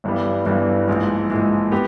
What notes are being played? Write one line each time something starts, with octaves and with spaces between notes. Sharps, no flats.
G1 G2 E3 G3 B3
G1 G2 E3 G3 B3
A#1 G#2 E3 G#3
A#1 G#2 E3 G#3
B3 G4